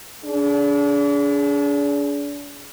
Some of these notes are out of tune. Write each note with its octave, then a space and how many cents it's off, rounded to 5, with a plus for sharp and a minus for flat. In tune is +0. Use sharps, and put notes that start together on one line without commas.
D4 -35 G#4 +10